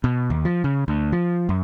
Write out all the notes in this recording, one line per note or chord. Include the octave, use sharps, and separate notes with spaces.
B2
D#2
F3
C#3
D2
F3
F#2